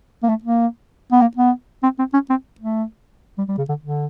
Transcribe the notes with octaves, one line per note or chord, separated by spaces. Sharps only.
A#3
A3
A#3
B3
A#3
B3
C4
C4
C#4
C4
A3
G3
G3
C#3
D3
D3